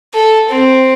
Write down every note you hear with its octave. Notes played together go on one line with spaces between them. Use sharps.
A4
C4